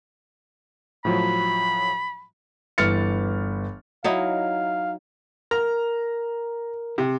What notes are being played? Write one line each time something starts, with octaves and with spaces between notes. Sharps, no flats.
A2 F3 F#3 B5
G1 E3 F6 A6 C#7
F#3 D#4 E4 F5
A#4 A#5
C3